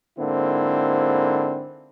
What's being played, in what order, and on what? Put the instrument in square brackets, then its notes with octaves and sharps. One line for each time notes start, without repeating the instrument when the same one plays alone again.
[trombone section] G#2 D3 A#3 C4 E4